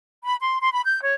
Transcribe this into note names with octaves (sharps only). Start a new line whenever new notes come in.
B5
C6
C6
B5
G6
C#5